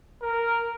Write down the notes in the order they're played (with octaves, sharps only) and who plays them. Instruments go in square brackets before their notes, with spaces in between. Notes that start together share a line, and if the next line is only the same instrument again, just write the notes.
[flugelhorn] A#4